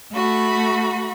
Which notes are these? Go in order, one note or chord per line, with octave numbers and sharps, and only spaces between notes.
A3 F#4 B5